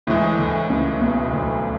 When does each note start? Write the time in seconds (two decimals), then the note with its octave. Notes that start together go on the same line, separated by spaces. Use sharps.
0.07 D2 A2 D3 E3 G#3
0.38 D2 D3
0.70 C#2 C#3
1.01 B1 B2
1.33 D2 D3